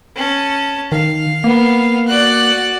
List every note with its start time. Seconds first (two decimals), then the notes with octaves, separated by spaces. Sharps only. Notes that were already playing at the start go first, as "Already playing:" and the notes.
0.16 C#4 A5
0.92 D#3 F5
1.44 A#3 B3
2.08 F#4 D5 F#6